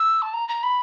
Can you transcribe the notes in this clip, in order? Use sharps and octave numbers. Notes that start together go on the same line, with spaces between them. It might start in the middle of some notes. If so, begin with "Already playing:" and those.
Already playing: E6
A5
A#5
A#5
B5